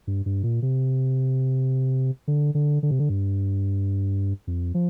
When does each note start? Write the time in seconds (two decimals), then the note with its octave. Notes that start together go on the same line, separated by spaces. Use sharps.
0.07 G2
0.26 G2
0.43 A#2
0.62 C3
2.28 D3
2.55 D3
2.83 D3
2.91 C3
2.99 D3
3.09 G2
4.47 F2
4.74 F3